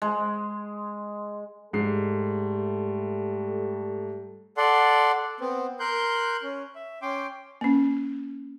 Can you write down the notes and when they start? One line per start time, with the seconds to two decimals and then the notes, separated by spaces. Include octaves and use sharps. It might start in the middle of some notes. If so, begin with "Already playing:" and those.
0.02 G#3
1.73 G#2 G3 A3 A4 C7
4.57 A4 D5 F#5 C6
5.41 B3 C4
5.80 A#4 C6 F#6 G6
6.43 C#4
6.75 E5
7.02 C#4 G5 C6 D6
7.61 A#3 C#4